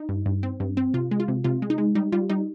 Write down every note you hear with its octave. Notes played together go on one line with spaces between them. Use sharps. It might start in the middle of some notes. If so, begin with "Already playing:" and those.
Already playing: D#4
G2
G2
C4
G2
C4
C3 F4
G#3
F4
C3
C3 F4
G#3
D#4
G#3
G3 D#4
G3 F4
G3 D#4